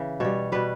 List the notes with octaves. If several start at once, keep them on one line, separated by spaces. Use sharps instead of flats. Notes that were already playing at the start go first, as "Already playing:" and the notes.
Already playing: C#3 E3
B2 G3 C#5
B2 G3 B4